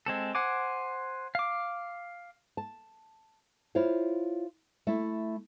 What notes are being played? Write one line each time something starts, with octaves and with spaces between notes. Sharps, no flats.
G#3 C4 A4
C5 F#5 G#5 D6
F5 D6
A5
E4 F4 C5 C#5
A3 E4